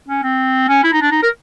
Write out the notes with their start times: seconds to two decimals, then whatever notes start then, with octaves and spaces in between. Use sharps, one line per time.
0.08 C#4
0.23 C4
0.68 C#4
0.84 E4
0.93 D#4
1.02 D4
1.11 D#4
1.23 A#4